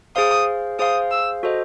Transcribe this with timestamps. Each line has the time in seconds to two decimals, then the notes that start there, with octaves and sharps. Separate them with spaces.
0.16 G#4 C5 F5 D#6
0.79 G#4 C5 F5 D#6
1.11 E6
1.43 F#4 A4 C5 D#5